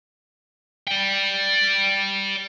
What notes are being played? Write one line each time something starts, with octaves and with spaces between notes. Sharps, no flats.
D5 G5